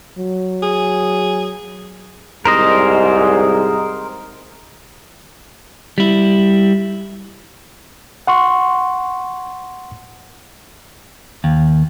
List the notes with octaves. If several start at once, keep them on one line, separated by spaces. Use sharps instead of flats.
F#3
G#4
C2 G#2 A#4 C5 D#5
G3 E4
F#5 C6 C#6
D#2